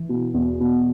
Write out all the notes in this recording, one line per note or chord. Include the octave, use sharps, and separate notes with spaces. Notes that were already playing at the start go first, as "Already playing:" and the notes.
Already playing: E3
B2
E2
B2